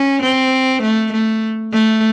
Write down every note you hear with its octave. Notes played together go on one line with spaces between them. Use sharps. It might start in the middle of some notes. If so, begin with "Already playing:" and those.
Already playing: C#4
C4
A3
A3
A3